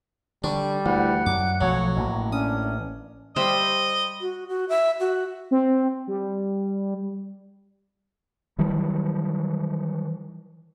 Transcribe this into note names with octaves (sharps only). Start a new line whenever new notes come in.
D3 G3 D4 C#6
D2 E3 F#5
F#2 D6
B1 F3 F#3 A3 C#5
A1 A2 A#3 F#4
C#4 D4 D#6
G3 C5 D#5 E5
F#4
F#4
E5
F#4
C4
G3
D#3 E3 F#3 G3